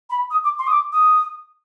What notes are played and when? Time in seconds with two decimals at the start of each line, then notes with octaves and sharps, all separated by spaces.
0.10 B5
0.31 D#6
0.44 D6
0.59 C6
0.67 D#6
0.72 D6
0.92 D#6